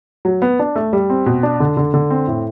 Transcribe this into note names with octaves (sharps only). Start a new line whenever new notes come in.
F#3
B3
D4
A3
G3
C4
B2
D4
D3
D3
D3
C4
A2